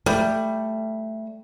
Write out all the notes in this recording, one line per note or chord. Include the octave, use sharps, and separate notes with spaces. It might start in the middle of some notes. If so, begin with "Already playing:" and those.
G3 A3